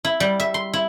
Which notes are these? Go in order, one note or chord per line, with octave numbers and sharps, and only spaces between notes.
E4
G3
E5
C6
E4